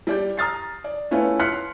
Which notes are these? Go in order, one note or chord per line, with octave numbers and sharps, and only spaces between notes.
G3 D5 G6
A#5 D#6 F6 A6 C7
D5
A3 C#4 E4 F4 B4
C6 F6 F#6 B6 C#7